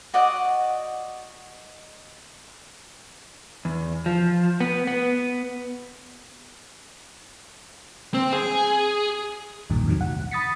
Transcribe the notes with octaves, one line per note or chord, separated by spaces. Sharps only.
F#4 D5 D#5 F#5
E2
F3
B3
B3
C4
G#4
B1 E2 G2 A#2 D#3
F#2 A2 C3 D#3 F#3
F#5
B5 D#6 A6 B6 C#7